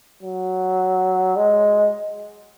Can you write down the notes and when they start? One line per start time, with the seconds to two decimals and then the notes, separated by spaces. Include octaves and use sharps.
0.23 F#3
1.36 G#3